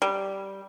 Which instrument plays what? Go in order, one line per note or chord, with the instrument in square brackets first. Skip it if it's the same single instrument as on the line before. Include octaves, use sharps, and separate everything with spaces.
[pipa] G3